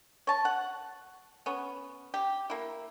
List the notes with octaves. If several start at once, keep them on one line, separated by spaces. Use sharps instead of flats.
C#5 A5
F#5
B3 C#4
G4
A#3 E4